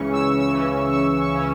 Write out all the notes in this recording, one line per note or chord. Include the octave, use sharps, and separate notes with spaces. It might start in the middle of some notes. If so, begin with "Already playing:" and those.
Already playing: C#2 C#3 E3 C#4 C#6
C#2 E6
E6
C#3 E3 C#4
C#6
C#2 E6
C#6
C#3 E3 C#4